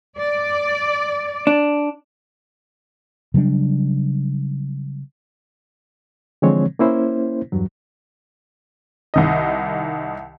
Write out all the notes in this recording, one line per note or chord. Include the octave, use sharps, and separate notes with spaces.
D5
D4
C#3 F#3 G3 D4
D3 E3 F3 G#3 C4 C#5
A#3 C#4 E4 C5
E2 G2 F#3
C2 D#3 D#5